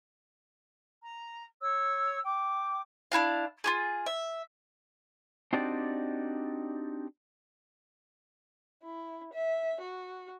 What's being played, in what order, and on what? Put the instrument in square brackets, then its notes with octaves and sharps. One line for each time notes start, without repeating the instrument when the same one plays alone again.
[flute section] A#5
C#5 E6
G5 D6
[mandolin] D4 E4 F#4 F5
F4 G4 G#4
E5
[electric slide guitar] C4 D4 D#4 F#4 G4 D5
[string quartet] E4
E5
F#4